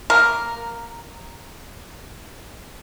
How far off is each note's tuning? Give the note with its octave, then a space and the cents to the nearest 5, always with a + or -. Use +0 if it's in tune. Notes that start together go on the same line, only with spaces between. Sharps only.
A#3 +0 A#4 +0